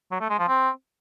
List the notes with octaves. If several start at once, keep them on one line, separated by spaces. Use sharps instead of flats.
F#3
A3
G#3
F3
C4